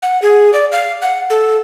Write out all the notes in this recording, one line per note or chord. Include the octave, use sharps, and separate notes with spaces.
F#5
G#4
D5
F5
F#5
A4